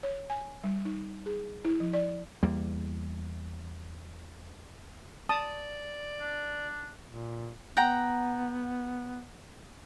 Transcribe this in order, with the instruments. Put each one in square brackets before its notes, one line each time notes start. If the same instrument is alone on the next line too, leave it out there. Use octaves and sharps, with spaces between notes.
[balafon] C#5
G#5
G3
D#4
G#4
E4
F3
D5
[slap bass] E2 G3 A#3
[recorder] D5 [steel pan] A5 D#6
[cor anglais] D4
[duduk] A#2
[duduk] B3 [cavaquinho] F#5 G5 A#5